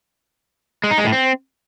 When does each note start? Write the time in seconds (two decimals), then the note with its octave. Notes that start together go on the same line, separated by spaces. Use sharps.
0.84 G#3
0.91 D#4
0.98 G#3
1.05 A2
1.12 C4